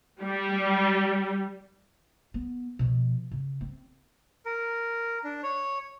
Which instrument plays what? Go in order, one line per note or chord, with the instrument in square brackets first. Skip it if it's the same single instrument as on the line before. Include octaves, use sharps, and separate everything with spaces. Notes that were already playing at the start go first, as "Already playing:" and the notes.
[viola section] G3
[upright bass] B3
B2 F3
C#3
C4
[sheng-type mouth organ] A#4
D4
C#5